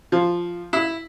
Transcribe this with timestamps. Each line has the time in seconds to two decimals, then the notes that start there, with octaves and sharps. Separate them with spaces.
0.12 F3
0.73 E4